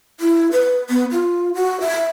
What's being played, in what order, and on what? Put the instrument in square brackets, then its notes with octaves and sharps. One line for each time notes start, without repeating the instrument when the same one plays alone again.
[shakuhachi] E4
B4
B3
F4
F#4
E5